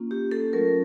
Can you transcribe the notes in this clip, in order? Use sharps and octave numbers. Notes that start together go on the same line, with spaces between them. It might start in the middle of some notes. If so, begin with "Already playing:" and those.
Already playing: A#3 C#4 F4
G4
A4
F#3 A3 C#4 F4 A#4